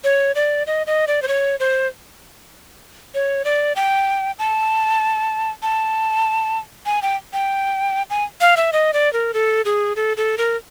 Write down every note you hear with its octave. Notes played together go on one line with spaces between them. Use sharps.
C#5
D5
D#5
D#5
D5
C5
C#5
C5
C#5
D5
G5
A5
A5
G#5
G5
G5
G#5
F5
E5
D#5
D5
A#4
A4
G#4
A4
A4
A#4